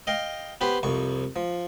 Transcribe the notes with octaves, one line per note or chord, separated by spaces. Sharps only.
D#5 F5 G5
B3 G4 B4 C5
C2 F2 C#6
F3